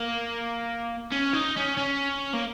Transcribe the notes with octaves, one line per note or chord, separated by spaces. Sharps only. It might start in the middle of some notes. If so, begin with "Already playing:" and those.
Already playing: A#3
C#4
D#4
C#4
C#4
A#3